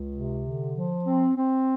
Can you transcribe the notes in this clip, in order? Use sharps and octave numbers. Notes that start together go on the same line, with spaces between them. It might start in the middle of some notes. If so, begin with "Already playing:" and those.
Already playing: C#2
C3
D3
F3
C4
C4